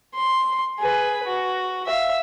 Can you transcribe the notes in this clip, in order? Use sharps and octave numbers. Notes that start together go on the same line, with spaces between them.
C6
G#4 B4
F#4
E5 F5